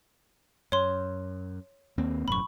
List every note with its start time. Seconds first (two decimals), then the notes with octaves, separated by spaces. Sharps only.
0.72 F#2 C#5 C6
1.98 D#2 A#3 C4
2.28 E1 F#2 A2 B5 C#6